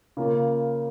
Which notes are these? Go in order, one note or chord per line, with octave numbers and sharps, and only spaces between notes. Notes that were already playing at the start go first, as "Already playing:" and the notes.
C#3 A#3 F4